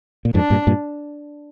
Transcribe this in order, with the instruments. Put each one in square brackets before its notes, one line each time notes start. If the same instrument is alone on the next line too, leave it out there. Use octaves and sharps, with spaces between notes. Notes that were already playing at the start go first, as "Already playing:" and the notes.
[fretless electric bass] A#2
[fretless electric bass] F2 G#2 [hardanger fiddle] D4
[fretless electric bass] G2 A#2
G2 A#2